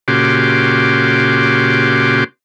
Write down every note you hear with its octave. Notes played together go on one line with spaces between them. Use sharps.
A#2 C#3 F#4 G4 C6 D6